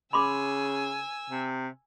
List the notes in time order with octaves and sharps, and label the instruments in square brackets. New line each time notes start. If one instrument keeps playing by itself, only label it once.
[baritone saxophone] C#3 [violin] G#5 E6 [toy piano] B5 C6 D6
[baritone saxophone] C3